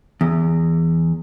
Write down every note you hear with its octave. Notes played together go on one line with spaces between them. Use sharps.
E2